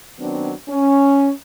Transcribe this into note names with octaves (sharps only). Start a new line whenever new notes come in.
D#3 F#3 B3 C4 D4
C#4